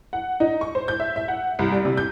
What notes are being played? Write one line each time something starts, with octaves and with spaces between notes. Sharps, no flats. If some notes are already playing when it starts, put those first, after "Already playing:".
F#5
D#4
C#6
C5
G6
E5
E5
F#5
C2
G3
C3
G6